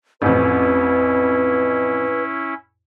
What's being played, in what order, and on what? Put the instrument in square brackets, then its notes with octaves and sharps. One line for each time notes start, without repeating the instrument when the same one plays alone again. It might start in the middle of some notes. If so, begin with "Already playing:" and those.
[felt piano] A1 F2 [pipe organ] C#4 E4 [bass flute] B4